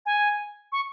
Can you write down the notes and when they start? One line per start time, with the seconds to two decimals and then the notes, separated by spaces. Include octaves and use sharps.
0.06 G#5
0.72 C#6